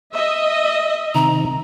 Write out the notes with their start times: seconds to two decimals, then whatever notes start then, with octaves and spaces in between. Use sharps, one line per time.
0.14 D#5 E5
1.15 C3 D#3 A#5